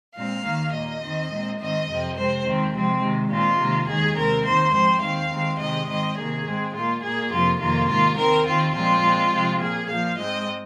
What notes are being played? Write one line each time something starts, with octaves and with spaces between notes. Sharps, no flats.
A#2 G#3 C4 F5
D#2 D#3 A#3
A#2 A#3 D#5
D#2 D#3 C4
A#2 G#3 C4
G#2 D#3 C4 D#5
F2 C3 F3 C4
C3 G#3 C4 C5
D#2 D#3 G#3 C4
C3 F3 G#3 C4
C3 D#3 G#3
A#2 G#3 C4 F4
C3 D#3 A#3
D#2 D#3 G#3 G#4
C3 G#3 C4 A#4
D#2 D#3 A#3 C5
G#2 F3 G#3 C4 C5
D#2 D#3 C4 F5
D#2 D#3 G#3 C4
C3 D#3 G#3 C4 D#5
G#2 D#3 C4 D#5
C3 D#3 A#3 G#4
G#2 G#3 C4
A#2 A#3 F4
A#2 A#3 G#4
F2 C3 F3 A#3 F4
F2 C3 D#3 A#3 F4
G#2 D#3 A#3 F4
D#2 D#3 C4 A#4
D#2 D#3 C4 F4
A#2 F3 G#3 C4 F4
A#2 G#3 C4
C3 F3 G#3 C4
A#2 A#3 G#4
A#2 F3 A#3 F5
G#2 G#3 C4 D#5